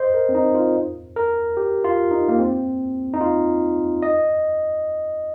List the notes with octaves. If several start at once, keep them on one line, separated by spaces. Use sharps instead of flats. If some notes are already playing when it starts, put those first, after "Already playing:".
Already playing: C5 D#5
A#4
C4
D#4
F4
A#4
G4
F4
D#4
A#3
C4
D#4
F4
D#5